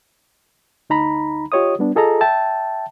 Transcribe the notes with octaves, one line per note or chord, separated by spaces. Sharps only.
D2 D#4 A#5 B5
F4 G4 C#5 D#5 D#6
G3 B3 D4
F4 G#4 A4 D#5 A#5
E5 G5 A5